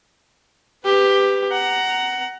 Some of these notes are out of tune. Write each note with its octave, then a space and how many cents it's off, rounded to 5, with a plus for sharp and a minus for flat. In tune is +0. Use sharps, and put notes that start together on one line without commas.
G4 +10 B4 +20
F#5 +15 A#5 +0